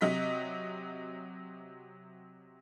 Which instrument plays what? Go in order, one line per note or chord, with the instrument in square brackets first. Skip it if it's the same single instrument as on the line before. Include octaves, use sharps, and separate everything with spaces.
[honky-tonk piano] C3 F#3 D#5 B6